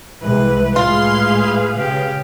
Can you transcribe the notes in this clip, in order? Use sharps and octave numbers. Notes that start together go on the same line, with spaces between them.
C2 E3 G#3 B4
A2 G#3 F4 G#4 B4 F5 C6
C#3 G4